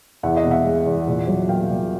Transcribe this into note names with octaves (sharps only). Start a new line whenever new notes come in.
E2 E5 F#5
D#5 F5
B2
E5 F#5
G#3
E2
A#2
F#3
A#3 F5 G5
A#2